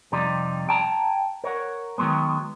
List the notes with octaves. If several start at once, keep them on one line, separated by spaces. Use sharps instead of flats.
F2 C3 G3 D#4
G5 A5 A#5
A#4 C#5 F#5
D#3 E3 F#3 G#3 B3